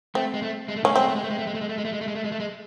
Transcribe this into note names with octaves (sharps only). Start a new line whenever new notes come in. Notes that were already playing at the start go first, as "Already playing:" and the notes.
A3 C4
G#3
A3
G#3
A3
G#3 C#4
A3
G#3 C4
A3
G#3
A3
G#3
A3
G#3
A3
G#3
A3
G#3
A3
G#3
A3
G#3
A3
G#3
A3
G#3